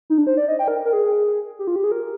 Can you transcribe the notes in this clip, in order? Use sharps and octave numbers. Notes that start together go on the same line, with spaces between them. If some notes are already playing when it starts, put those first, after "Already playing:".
D#4
D4
C5
D5
D#5
G5
A#4
A#4
G#4
G4
F4
G4
G#4
A#4